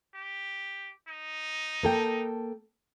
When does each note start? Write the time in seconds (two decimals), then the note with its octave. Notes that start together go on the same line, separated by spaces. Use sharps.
0.15 G4
1.08 D#4
1.83 A#3 A4 G5